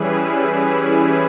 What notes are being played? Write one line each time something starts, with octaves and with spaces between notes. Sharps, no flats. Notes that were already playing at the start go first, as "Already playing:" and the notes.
Already playing: E3 G3 C#4 E4 G#4 B4
G#4